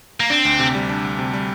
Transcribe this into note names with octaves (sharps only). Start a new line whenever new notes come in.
A#3
C4 D4
D2
C3
G3
D4
D2
C3
G3